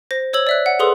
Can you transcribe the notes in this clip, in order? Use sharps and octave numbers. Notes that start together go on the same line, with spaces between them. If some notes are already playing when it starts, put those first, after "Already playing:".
C5 A#6
C5 C#5 E6 G#6 F#7
D5 E5 F#6
F#5
G#4 A4 B4 C6 D#6